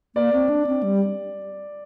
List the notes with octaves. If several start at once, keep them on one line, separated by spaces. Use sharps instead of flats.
A#3 D5
C4
D4
C4
G3